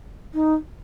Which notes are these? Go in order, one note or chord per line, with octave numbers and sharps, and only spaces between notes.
D#4